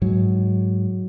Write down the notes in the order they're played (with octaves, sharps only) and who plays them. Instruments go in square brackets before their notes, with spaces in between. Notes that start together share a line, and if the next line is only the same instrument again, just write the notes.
[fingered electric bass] G#2 F#3